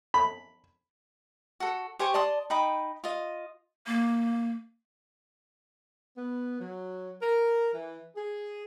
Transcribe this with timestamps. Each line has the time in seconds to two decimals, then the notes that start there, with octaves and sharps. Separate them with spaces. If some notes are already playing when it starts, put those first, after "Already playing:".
0.14 B5
1.60 F#4 A4
1.99 G4 C5 G#5 C#6
2.14 D5 A5 C6 D#6
2.50 D#4 G5 B5 D#6
3.04 F4 D#5
3.87 A#3
6.17 B3
6.59 F#3
7.21 A#4
7.74 E3
8.16 G#4